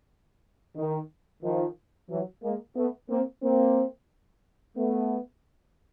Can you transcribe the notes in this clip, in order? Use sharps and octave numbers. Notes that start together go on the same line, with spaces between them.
D#3
D#3 F3
E3 F#3
G#3 A#3
A3 B3
A#3 C4
A#3 C4
A3 B3